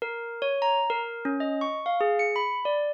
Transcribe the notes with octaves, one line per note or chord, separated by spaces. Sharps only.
A#4
C#5
A#5
A#4
C#4
D#5
C#6
F5
G#4
C#7
B5
D5